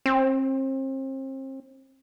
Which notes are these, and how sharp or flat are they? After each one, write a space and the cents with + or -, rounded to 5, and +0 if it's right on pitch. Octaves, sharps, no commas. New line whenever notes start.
C4 +35